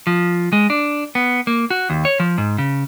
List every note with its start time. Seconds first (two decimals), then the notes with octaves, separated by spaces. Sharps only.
0.07 F3
0.53 G#3
0.70 D4
1.15 B3
1.47 A#3
1.71 F#4
1.90 D#2
2.05 C#5
2.20 F3
2.38 G#2
2.58 C#3